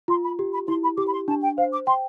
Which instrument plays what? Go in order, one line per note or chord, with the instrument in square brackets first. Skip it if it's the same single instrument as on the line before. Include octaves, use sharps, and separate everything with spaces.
[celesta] F4 [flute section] C6
[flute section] B5
[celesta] G4
[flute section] B5
[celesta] E4 [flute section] C6
[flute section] B5
[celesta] G4 [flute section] D6
[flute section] B5
C6
[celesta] D4 [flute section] A5
[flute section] G5
[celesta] C5 [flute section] F5
[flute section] D6
[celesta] G5 [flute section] C6